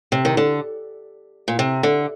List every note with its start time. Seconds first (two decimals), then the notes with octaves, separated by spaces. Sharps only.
0.12 C3
0.25 D#3
0.37 D3
1.48 A#2
1.59 C3
1.83 D3